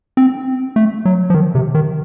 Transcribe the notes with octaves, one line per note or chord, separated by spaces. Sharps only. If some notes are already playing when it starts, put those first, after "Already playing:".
C4
A3
F#3
F3
D#3
C3
D#3